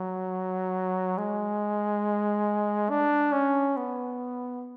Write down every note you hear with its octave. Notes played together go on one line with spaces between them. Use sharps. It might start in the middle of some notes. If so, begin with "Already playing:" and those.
Already playing: F#3
G#3
D4
C#4
B3